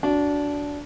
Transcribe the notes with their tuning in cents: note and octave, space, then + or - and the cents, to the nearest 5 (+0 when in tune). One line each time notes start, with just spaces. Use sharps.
D4 -15 F#4 +0